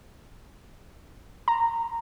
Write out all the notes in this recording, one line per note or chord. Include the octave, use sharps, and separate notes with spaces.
A#5